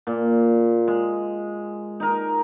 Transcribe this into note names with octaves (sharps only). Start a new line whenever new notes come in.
A#2
G#3
D#4 A#4